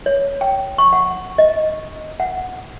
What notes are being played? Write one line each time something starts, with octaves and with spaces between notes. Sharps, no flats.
C#5
G5
C#6
F#5
D#5
F#5